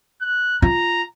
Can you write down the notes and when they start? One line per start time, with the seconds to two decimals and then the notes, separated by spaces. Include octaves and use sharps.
0.21 F#6
0.62 F4 A#5